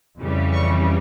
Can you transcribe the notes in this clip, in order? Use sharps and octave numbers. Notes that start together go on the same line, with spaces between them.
F2 C#3 E3 G3
C#6